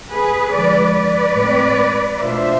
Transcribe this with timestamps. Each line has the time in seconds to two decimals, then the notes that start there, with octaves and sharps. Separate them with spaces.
0.10 G#4 B4
0.51 D3 F3 G#3 B4 D5
0.93 B4 D5
1.35 A2 G#3 C4
2.18 B2 A3 D4 F4 C5 E5